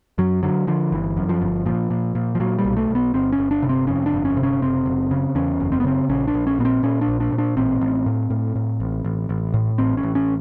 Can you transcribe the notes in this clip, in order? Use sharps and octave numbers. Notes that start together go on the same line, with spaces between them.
F#2 F#3
D3 F#3
D3 F3
G1 E3
F#2
F3
G1
A#2 F3
A#2
A#2
F3
A#2 F#3
G3
B1
A3
B1
B3
G1 C4
C#4
G1
D4
C3
C4
F2 C#4
D4
G1
C#4
C3
C#4
F#1 C4
F#1
C#3
E2 C#4
F#1
C4
B3
C#3 C4
A#1 C#4
D4
A#1
C#4
A#2 B3
C4
A#2 C#4
D4
A#1
D4
A#2
D4
A1 C4
A1
A2
A2
A2
A1
A1
A1
A2
A1 C4
C#4
A1
C#4